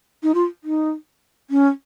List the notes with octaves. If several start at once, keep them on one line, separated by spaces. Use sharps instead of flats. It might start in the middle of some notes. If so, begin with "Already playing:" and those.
D#4
F4
D#4
C#4